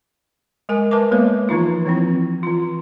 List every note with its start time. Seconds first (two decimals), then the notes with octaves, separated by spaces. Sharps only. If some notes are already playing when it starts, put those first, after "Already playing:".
0.69 G#3 A#4 G#5
0.91 A#4 B4 E5 A5 D6
1.11 G#3 A#3 B3 B4 C#5
1.49 E3 F3 D#4 F4
1.86 E3 F3 C4 E4
2.43 E3 F4